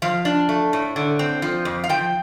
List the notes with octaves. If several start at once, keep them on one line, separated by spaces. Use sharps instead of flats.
F3 F5
D4
A3
A2
D3
C4
F3
F2
F5
F3 G5